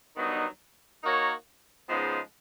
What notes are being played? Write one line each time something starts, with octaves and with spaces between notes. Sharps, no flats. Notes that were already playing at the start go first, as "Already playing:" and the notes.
G2 D#3 F#3 B3 D#4
A#3 D#4 F#4 A#4 C#5
C#3 F3 G#3 B3 D#4